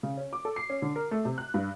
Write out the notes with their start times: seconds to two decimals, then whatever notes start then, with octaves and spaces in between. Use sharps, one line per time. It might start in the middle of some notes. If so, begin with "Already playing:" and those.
0.03 C#3
0.17 C#4
0.33 D6
0.45 A4
0.56 C7
0.70 C#4
0.82 D3
0.96 A#4
1.11 A3
1.25 C3
1.38 F#6
1.54 G2